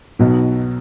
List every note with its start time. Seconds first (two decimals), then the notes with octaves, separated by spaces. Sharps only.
0.19 B1 B2 F#3 B3 D#4